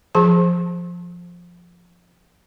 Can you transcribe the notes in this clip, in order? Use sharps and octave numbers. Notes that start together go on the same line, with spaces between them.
F3 G#4 A5